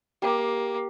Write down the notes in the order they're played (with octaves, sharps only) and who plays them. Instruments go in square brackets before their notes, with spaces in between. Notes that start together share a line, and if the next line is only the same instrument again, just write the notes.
[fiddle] A#3 [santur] G4